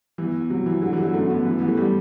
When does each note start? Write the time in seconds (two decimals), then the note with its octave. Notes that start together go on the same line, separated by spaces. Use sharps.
0.18 E2 E3
0.35 E2
0.50 C3 F#3
0.66 E3
0.82 D3 F#3
0.93 E3
0.98 D3
1.03 F#3
1.14 F#2 A3
1.30 F#2 B3
1.45 E3
1.59 E3 B3
1.68 A3
1.77 G3